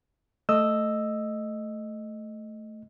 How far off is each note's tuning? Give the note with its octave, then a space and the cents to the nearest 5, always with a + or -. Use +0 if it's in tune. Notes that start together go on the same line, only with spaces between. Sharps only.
A3 +0 D#5 -5 E6 +0